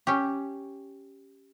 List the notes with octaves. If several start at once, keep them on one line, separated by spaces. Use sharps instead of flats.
C#4 G4